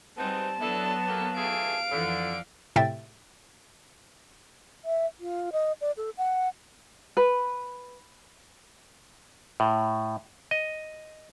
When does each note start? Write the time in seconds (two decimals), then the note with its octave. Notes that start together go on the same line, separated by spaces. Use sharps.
0.17 G3 G#3 B3 C4 D#4 A5
0.60 F#3 B3 D4 E4 A4
1.07 A#3 G4 A4
1.35 E3 A3 G#4 F5 D7
1.90 F2 D3 E3 F3
2.76 A2 C3 E5 G5 A6
4.84 E5
5.20 F4
5.53 D#5
5.81 D5
5.97 A4
6.18 F#5
7.17 B4
9.60 A2
10.51 D#5